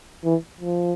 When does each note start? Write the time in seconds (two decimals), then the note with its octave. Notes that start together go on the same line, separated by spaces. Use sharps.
0.24 E3
0.61 F3